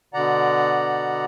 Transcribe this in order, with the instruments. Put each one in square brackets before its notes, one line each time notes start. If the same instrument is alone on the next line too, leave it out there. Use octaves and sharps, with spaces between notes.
[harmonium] B2 D3 D5 F#5 A#5